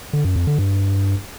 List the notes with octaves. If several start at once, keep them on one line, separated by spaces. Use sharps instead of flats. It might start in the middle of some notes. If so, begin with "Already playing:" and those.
D3
F#2
F2
D3
G2